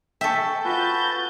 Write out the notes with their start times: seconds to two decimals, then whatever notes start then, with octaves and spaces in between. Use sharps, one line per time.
0.21 A4 E5 G5 G#5 C#6
0.65 F4 F#4 B4 A5 G6 A6